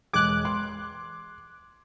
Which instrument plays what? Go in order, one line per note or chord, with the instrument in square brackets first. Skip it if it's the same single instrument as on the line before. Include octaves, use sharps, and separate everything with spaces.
[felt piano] E1 G#3 G#6 [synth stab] D6 F#6
[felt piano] C6